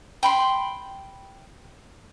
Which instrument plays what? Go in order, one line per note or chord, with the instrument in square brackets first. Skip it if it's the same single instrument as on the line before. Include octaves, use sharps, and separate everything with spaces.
[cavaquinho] G5 B5 C6